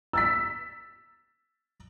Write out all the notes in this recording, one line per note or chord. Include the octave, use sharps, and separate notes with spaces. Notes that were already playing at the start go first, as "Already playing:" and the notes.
E6 A6 B6